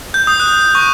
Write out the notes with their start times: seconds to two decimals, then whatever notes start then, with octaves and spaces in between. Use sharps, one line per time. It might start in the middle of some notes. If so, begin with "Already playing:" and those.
0.14 G6
0.27 D#6
0.40 F#6
0.75 C#6